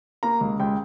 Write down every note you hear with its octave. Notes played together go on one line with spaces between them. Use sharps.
A#3 A#5
C#2
C#2 G5